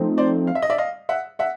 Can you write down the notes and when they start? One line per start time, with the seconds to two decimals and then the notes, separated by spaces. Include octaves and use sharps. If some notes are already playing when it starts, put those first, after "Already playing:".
Already playing: F3 A3 C4 D#4
0.18 C5 D5
0.47 F5
0.55 E5
0.62 D#5
0.70 D5 E5
0.78 D#5 F5
1.09 E5 F#5
1.39 E5 F#5